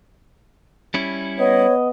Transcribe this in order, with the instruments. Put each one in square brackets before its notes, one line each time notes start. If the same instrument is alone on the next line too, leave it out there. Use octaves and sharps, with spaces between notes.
[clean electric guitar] G3 C#4 E4
[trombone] B3 [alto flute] C#5 [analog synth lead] D#5